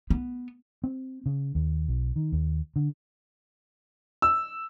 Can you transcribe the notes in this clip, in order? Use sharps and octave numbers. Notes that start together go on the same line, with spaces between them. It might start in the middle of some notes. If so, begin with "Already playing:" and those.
B3
C4
C#3
D#2
B1
D#3
D#2
D3
E6